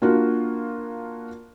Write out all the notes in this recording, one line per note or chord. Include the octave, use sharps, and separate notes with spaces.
A#3 D4 F4 F#4